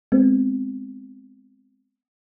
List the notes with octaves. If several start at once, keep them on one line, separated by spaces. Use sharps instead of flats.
G#3 B3 C4